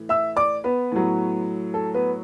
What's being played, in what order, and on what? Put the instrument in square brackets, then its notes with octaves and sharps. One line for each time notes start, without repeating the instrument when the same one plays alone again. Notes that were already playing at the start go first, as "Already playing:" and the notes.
Already playing: [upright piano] A2 E3
E5 E6
D5 D6
B3 B4
A2 F#3
A4
B3 B4